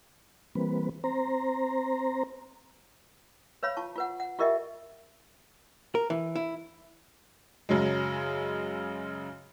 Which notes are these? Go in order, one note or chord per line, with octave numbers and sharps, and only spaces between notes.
E3 G3 A#3 C4 B4
C4 C5 A#5
B4 C#5 F5 B5
F4 A5 C#6
F4 B4 F#5
F#5
F4 G4 A#4 D#5 E5 G5
A#4
E3
E4
F#2 C#3 F#3 G#3